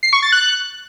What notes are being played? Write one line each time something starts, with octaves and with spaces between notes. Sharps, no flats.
C7
C#6
A6
F#6